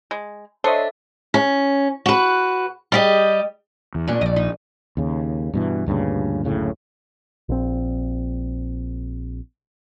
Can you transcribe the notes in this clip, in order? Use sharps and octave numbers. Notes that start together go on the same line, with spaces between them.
G#3
D4 A4 C5 C#5 D#5 E5
C#4
F#4 B4
G3 G4 D#5
E2
A#2 C#4 D4
A#1 D5 D#5
D#4
D#2 C#3
G2 B2 E3
D2 G2 A#2 C#3
F#1 D2 A2 C#3
A#1 C4